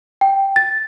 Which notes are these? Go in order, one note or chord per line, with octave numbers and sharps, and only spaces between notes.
G5
A6